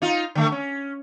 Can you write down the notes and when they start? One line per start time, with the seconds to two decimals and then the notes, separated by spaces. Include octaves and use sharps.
0.02 D#4 F4
0.35 D3 A3
0.52 C#4